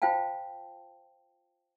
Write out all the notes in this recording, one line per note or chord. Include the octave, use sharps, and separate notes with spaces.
F4 C5 F5 G5 A5